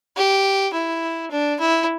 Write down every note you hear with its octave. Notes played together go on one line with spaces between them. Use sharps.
G4
E4
D4
E4